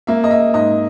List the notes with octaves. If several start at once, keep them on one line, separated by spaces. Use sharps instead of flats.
A#3 E5
D#5
E5
G#2 D#5